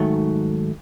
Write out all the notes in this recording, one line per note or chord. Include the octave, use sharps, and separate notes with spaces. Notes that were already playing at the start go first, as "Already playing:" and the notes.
Already playing: G#2 D#3 F#3 A3